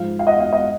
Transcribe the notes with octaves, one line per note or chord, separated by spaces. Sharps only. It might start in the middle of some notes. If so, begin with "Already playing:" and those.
Already playing: G#2 F3 F5
F5
D#5 F#5
F5
D#5